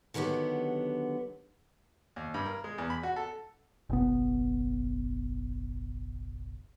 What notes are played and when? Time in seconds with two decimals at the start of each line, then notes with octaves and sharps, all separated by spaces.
0.14 D3 D#3 F#3 B3 G4
2.16 D#2
2.34 G2
2.45 A#4
2.64 G#3
2.78 E2
2.90 B5
3.03 F#4
3.16 A4
3.90 F#1 B1 B3